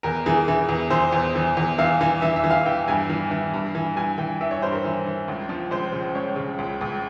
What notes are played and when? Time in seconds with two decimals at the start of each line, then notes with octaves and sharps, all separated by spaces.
0.03 E2 A#4
0.26 E3 G#4
0.48 E3
0.69 E2
0.90 E3 C5
1.12 E2
1.35 E3
1.57 E2
1.78 E3 F5
2.01 E3
2.22 E3 E5
2.36 E5
2.44 E3
2.50 F5
2.66 E3 G5
2.87 G2 G#5
3.10 E3
3.31 E3
3.53 G2
3.75 E3
3.96 G2 G#5
4.18 E3 G5
4.41 E3 E5
4.51 C#5
4.62 G2 C5
4.72 A#4
4.84 E3
5.06 E3
5.28 C#2
5.49 F3
5.71 C#2 C5
5.92 C#3
6.15 C#2 C#5
6.36 C#3
6.58 C#2
6.81 C#2